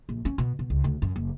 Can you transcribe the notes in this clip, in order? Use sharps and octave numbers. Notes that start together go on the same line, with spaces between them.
A#1
C#4
B2
B2
C#2
D2
F#2
F#1